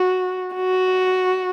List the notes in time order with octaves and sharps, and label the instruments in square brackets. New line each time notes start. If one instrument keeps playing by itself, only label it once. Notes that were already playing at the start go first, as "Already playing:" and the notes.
Already playing: [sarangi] F#4
F#4